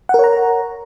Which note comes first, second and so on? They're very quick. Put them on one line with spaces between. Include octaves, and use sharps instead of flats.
F#5 A#4 C#5 A#5